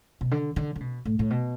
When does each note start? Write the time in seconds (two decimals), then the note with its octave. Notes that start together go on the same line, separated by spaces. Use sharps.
0.21 B2
0.31 D3
0.56 D3
0.76 D3
0.81 B2
1.05 A2
1.19 A2
1.30 B2